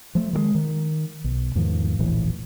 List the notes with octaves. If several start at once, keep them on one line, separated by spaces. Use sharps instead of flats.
F3 A3
D#3 E3 G#3
D#3
B1
E2 G#2 D#3 F3
D#1 A#1 A2 E3